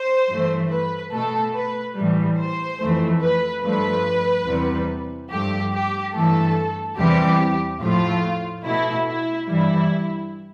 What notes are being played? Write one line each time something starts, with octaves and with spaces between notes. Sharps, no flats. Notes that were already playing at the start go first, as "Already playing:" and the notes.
Already playing: C5
G2 E3 A3
B4
B2 A3 A4
B4
A2 E3 G3
C5
F2 E3 A3
B4
G2 F3 A3 B4
E2 C3 G3
G2 F3 A3 G4
G4
G2 E3 A3 A4
E2 C3 E3 G3 G4
A2 F3 A3 F4
B2 A3 E4
E4
G2 E3 G3 E4